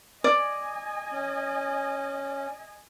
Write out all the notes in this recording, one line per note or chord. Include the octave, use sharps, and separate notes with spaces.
D5 D#5 G#5
C#4